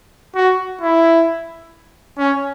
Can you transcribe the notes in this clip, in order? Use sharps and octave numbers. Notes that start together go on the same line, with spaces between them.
F#4
E4
C#4